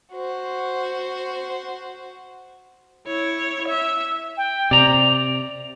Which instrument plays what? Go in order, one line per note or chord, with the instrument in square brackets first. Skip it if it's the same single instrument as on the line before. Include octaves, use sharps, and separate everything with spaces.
[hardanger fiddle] F#4 C5
[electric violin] E4 C#5
E5
[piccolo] G5
[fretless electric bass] C3 [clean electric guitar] D5 A#5 [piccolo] F7